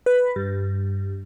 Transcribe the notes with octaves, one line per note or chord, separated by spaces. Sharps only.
B4
G2